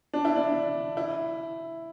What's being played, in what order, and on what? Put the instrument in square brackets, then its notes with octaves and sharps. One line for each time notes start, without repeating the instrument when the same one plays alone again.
[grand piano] D4
E4
D4
E4